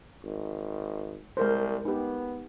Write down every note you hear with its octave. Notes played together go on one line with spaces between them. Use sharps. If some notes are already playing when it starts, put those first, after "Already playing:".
G#1
C2 G#3 A#4 C5
B3 D#4 G4